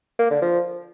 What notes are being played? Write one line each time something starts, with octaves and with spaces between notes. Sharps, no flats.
A#3
D3
F3